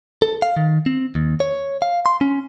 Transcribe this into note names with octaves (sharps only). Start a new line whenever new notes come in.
A4
F5
D#3
C4
D#2
C#5
F5
C6
C#4